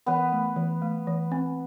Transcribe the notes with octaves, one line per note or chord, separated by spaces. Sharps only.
E3 B3 B4
A3
E3
A3
E3
C4